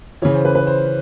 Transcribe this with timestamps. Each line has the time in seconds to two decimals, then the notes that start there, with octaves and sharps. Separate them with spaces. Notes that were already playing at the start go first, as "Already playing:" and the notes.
0.22 C#3 E3 C#5
0.33 C5
0.45 B4
0.55 B4
0.67 C5